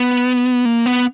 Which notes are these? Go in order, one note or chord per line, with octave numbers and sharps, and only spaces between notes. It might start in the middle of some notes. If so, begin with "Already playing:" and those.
Already playing: B3
A#3
B3